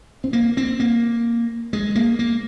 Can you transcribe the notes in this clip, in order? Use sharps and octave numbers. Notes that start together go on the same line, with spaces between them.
C4
A#3
C4
A#3
G#3
A#3
A#3